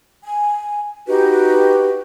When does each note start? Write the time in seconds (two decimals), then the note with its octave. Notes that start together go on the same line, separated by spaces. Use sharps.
0.23 G#5
1.07 D#4 F#4 G4 B4